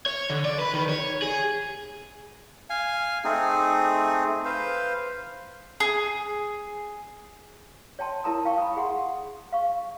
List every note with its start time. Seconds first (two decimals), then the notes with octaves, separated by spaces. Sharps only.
0.06 C#5
0.30 D3
0.45 D5
0.59 B4
0.74 D#3
0.89 C#5
1.22 G#4
2.70 F5 G#5
3.24 A3 C4 D#4 G#4
4.45 B4 C5 F5
5.80 G#4
7.99 C#5 G5 A5 C6
8.24 E4 A#4 A5 A#5 D#6
8.45 F5 G5 C#6
8.58 B5 D#6
8.76 G#4 F#5 C6
9.52 F5 C#6